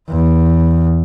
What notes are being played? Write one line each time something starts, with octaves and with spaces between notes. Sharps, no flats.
E2